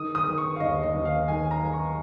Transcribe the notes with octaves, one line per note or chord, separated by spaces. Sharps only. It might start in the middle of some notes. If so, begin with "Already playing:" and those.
Already playing: D#3 D#6
D#6
D#3
C#6
F5
D#2 D#5
D#5
D#2
F5
D#3 G#5
A#5
D#3
C#6